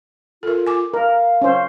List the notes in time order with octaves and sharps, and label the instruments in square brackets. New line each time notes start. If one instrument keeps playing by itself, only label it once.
[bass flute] F4 [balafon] A4 A#4
[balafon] G#5 D6
[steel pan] A#4 [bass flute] F5
[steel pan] C#4 C5